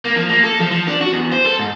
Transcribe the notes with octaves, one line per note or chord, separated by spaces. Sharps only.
A#3
F3
A#3
A4
F3
F3
D4
F#4
E2
C5
A4
G#2